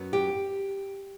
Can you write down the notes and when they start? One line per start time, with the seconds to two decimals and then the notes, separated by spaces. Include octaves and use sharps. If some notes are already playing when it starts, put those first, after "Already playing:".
Already playing: F#2 F#3 B3
0.13 G4